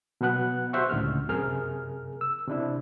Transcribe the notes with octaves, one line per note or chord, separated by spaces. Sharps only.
B2 F#3 B4 F#5 F#6
F#4 G4 C5 E5 F#5 C#6
C#2 A2 D3 A3 F6
F#2 C3 G#4 A#4 F6
E6
C3 D4 E4